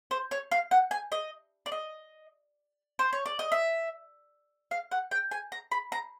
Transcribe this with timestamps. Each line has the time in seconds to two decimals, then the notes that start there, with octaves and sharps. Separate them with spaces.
0.11 C5
0.31 C#5
0.51 F5
0.71 F#5
0.91 G#5
1.12 D#5
1.66 D5
1.72 D#5
2.99 C5
3.13 C#5
3.26 D5
3.39 D#5
3.52 E5
4.71 F5
4.92 F#5
5.11 G5
5.31 G#5
5.52 A#5
5.72 B5
5.92 A#5